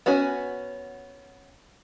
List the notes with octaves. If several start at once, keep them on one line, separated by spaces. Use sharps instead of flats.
B3 C#4 F#4 G#5